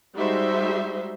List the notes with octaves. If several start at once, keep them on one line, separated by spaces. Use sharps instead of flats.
G3 G#3 D#4 F#4 C5 E5